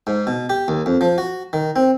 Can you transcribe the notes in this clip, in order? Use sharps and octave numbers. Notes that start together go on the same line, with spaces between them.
G#2
B2
G4
D#2
F2
F3
F#4
D#3
C4